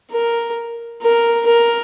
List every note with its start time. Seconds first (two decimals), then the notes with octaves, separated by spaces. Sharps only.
0.11 A#4
1.02 A#4
1.46 A#4